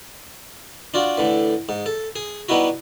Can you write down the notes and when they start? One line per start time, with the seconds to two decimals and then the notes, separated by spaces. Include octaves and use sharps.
0.94 D4 F4 F#4
1.18 A2 D3 E3
1.69 G#2
1.86 A4
2.16 G#4
2.49 G3 B3 D#4 E4 F#4